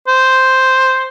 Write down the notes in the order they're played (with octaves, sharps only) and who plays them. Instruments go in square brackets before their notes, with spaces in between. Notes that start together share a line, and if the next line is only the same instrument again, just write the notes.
[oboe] C5